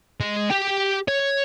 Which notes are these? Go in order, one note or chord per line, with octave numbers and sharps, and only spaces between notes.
G#3
G4 G5
C#5